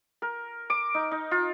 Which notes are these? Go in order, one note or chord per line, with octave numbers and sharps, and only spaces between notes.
A#4
D6
D#4
D#4
F4